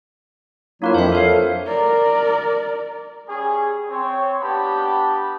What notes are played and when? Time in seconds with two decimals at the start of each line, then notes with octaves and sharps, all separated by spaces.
0.82 F#3 A#3 D4 E4 F4 A#4
0.94 F2 F3 C5 E5
1.12 A4 C#5 F5
1.67 A#4 D5
3.27 G3 C#4 G#4
3.90 C4 C#5
4.41 B3 D4 G4 A5 B5